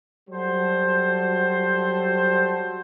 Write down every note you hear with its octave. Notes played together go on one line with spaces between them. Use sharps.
F#3 G3 F#4 A4 C5